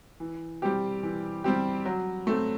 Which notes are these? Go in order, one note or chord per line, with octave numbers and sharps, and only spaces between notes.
E3
G3 C4 G4
E3
G3 C4 G4
F#3
A3 C4